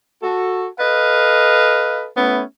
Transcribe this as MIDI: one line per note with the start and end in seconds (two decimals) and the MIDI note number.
0.23 0.67 66
0.23 0.67 69
0.80 2.07 69
0.80 2.07 71
0.80 2.07 75
0.80 2.07 77
2.17 2.42 57
2.17 2.42 59
2.17 2.42 61
2.17 2.42 64